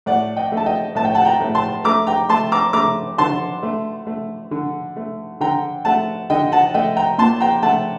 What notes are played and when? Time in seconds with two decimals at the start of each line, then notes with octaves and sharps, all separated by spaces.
0.06 A2 D5 F#5
0.36 D#5 G5
0.52 A3
0.57 A5
0.66 D#5 G5
0.95 A2 A5
1.05 G5
1.15 F#5 A5
1.25 G5 A#5
1.40 A2
1.55 A5 C6
1.84 A3 A#5 D6
2.07 G5 A#5
2.29 A3 A5 C6
2.52 A#5 D6
2.73 A3 A#5 D6
3.18 D3 A5 C6
3.63 A3
4.07 A3
4.51 D3
4.96 A3
5.41 D3 G5 A#5
5.85 A3 F#5 A5
6.30 D3 D#5 G5
6.52 F#5 A5
6.74 A3 D#5 G5
6.97 G5 A#5
7.18 A#2 A5 C6
7.40 G5 A#5
7.63 A3 F#5 A5